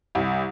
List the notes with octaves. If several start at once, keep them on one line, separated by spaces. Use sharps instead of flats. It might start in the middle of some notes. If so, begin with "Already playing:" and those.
C2